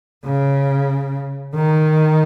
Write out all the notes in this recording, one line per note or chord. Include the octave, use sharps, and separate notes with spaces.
C#3
D#3